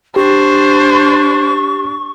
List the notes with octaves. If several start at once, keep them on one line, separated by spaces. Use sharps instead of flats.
D4 G4 C5 C#6